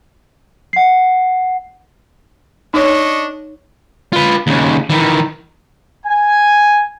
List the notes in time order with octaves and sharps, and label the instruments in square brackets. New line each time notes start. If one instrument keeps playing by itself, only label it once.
[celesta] F#5 C7
[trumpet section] D4 D#5 C#6 [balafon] D#4 C#5
[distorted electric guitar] F4 B4
D#2 C#3
D#3 E3
[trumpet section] G#5